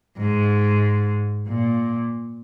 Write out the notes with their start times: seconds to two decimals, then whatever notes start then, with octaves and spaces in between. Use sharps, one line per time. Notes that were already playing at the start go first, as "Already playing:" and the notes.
0.18 G#2
1.48 A#2